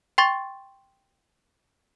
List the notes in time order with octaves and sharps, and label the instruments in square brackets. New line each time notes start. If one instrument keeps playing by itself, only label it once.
[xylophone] G5 C6 C#6 A6